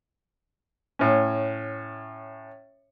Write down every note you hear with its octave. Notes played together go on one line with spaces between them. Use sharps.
A2 C#4